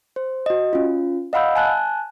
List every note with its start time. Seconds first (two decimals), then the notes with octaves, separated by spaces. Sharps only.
0.16 C5
0.46 F#4 D#5
0.73 C#4 F4
1.33 D#5 F5 F#5 B5 E6 G6
1.56 G#5 A5 F#6